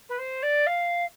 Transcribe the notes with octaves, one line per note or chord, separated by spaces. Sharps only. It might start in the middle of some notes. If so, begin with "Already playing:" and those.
B4
C5
D5
F5